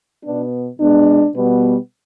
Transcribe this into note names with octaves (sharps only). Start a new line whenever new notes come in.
B2 B3 D4
B2 G#3 B3 D4
B2 G3 B3